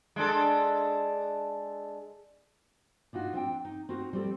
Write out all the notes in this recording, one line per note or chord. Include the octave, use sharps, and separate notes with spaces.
G#3 D4 A4
D4 D#4 F4 F#4
C4 D4 G5
D#4
C4 D#4 F#4 A#4
G3 C4 A4